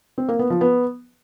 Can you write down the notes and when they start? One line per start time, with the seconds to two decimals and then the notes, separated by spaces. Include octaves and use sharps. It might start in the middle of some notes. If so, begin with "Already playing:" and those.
0.18 C4
0.28 A#3
0.39 B3
0.50 F3
0.61 B3